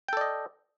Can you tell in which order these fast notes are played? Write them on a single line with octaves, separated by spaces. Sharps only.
G5 A4 D5 D#5